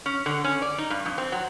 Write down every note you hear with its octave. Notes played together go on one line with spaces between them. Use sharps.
C#4
D3
C#4
D5
D#4
G2
F2
C4
F#3